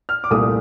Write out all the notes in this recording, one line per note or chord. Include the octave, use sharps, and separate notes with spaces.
F6
D6
C2 A#2 A3 D#6